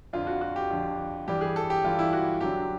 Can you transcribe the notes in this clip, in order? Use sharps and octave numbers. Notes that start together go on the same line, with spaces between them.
F2 D3 F3 F4
F#4
F#4
G4
F2 D3 F3
G2 E3 G3 G4
G#4
A4
G4
G2 E3 G3 F4
E4
F#4
F#2 D3 F#3 G4